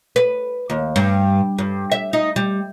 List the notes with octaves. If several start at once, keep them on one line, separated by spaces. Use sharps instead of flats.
B4
D#2
G2
G2
E5
D#4
G3